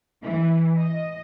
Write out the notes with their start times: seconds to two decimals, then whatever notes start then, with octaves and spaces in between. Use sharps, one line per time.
0.23 E3
0.77 D#5